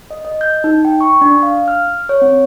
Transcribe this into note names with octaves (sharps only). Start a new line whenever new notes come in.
D#5
D#5
G6
D#4
G5
C#6
D4
F5
F6
C#5
C4